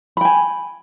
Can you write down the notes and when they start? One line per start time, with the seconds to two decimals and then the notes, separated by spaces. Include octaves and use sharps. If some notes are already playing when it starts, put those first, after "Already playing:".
0.17 B5
0.21 G5
0.25 G#5